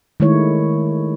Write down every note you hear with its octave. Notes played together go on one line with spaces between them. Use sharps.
D#3 G#3 A3 E4 C#5